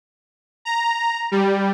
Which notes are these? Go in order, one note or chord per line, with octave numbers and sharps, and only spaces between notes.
A#5
G3